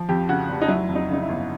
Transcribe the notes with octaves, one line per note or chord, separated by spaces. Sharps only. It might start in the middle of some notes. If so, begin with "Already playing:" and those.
Already playing: F3
F2 G4
C#3 F#4
F1
D#4
F#3 E4
F2
D#4
C#3 D#4
E4
G1